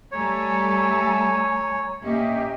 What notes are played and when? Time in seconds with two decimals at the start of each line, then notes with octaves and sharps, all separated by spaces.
0.12 G3 A3 A4 C#5 G#5 A#5
2.01 A#2 A#3 C#4 G4 D#5 E5